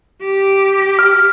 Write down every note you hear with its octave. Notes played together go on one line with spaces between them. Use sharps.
G4
F6